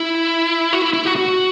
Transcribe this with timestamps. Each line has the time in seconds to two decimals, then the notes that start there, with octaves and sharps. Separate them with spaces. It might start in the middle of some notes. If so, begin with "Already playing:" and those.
Already playing: E4
0.73 F#4
0.82 E4
0.93 E4
1.05 F#4
1.16 F#4